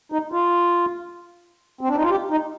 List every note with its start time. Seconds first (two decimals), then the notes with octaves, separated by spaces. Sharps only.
0.12 D#4
0.32 F4
1.81 C4
1.88 D4
1.96 D#4
2.02 F4
2.10 G4
2.30 D#4